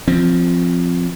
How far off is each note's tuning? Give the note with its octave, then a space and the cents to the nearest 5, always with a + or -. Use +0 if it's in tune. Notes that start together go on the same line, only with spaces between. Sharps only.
F3 +0 C4 +0